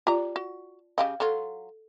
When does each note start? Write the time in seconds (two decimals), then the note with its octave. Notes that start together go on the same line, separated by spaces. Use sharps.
0.07 F4 G4 D5 A#5
0.36 F#4
0.98 C#3 G4 D#5 F5
1.20 F#3 F4 A4